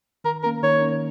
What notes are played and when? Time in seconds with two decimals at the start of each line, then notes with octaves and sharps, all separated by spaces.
0.24 D#3 A#4
0.44 A#3 C#4 A#4
0.63 D#3 C#5
0.81 A#3 C#4